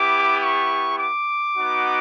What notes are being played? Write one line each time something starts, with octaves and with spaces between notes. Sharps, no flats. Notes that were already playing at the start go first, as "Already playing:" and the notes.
Already playing: B3 E4 G4 D6
C#6
D6
B3 D#4 F#4